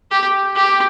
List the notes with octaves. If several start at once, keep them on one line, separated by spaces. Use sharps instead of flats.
G4
G4